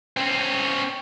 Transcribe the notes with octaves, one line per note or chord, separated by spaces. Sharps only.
C4 C#4